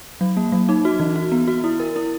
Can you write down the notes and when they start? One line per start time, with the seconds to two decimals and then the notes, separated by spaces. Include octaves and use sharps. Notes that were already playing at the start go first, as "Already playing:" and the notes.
0.21 F#3
0.37 A#3
0.52 F#3
0.69 D#4
0.85 F#4
1.00 E3
1.16 F#4
1.32 B3
1.48 F#4
1.64 E4
1.80 A#4
1.96 E4